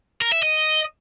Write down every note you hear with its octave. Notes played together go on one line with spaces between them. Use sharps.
A#4
E5
D#5